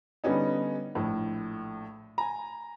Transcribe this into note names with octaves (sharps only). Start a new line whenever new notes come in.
D3 G3 B3 C#4 D#4
A#1 A2
G#5 A#5